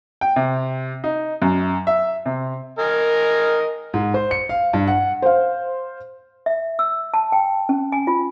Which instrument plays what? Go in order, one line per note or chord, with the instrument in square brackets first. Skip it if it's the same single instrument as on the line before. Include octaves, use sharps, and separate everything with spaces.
[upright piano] G5
C3
D#4
F#2
E5
C3
[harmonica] A#4 D#5 G#5
[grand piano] G#2
C5
C#7
F5
G2
F#5
[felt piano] C5 F5
[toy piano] E5
E6
A5
G5
C#4
G#5
F4